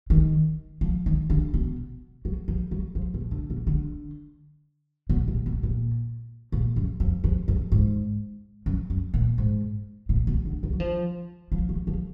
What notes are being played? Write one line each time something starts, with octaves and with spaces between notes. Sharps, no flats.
D#3
F3
D#3
D3
B2
F#3
F3
F#3
F3
B2
D3
B2
D3
B2
A#2
B2
A#2
A#2
F#2
F2
F2
F#2
G#2
F#2
F#2
A#2
G#2
A#2
B2
D3
D#3
F#3
F3
F3
F#3
F3